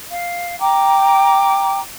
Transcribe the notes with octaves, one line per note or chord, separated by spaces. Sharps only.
F5
G5 A#5 D6